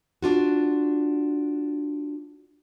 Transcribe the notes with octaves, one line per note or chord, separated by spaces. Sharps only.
D4 F4 F#4